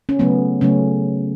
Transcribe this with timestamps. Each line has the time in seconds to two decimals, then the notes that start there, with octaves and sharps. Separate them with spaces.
0.09 C#4
0.19 C#3 F#3 A3 B3
0.61 C#3 F#3 A3 C#4